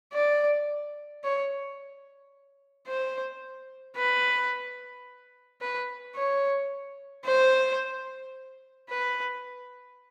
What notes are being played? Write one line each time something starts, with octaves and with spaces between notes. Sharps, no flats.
D5
C#5
C5
B4
B4
C#5
C5
B4